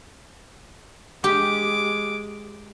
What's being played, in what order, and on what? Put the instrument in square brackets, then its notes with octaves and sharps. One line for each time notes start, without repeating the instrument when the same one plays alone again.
[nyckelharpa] G#3 D6 [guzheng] G4